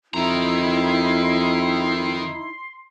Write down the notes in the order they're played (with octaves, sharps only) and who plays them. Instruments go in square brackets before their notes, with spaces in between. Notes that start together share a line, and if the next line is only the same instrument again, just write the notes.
[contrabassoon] F2 [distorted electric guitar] D#3 A#5 [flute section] D#4 E4 [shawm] C6